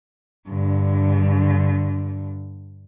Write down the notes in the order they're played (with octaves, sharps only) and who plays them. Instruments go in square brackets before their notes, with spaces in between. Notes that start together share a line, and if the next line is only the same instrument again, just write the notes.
[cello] G2 D3